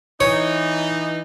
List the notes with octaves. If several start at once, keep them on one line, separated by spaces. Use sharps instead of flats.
E3 D#4 C#5